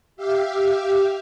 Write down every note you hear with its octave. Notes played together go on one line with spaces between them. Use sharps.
G4 E5 F5